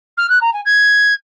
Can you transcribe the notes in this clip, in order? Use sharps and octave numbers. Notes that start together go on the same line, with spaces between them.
F6
F#6
A#5
G#5
G#6